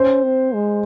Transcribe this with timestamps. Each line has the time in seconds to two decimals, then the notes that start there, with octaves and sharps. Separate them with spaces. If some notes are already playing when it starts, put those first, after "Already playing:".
Already playing: C#4 C5
0.23 C4
0.54 G#3